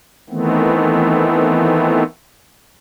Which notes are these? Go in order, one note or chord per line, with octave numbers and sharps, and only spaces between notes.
D#3 E3 A3 B3 C4